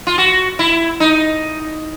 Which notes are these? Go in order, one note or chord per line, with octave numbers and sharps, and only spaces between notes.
F4
F#4
E4
D#4